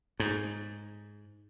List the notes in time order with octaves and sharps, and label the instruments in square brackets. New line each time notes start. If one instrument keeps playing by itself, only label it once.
[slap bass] G#2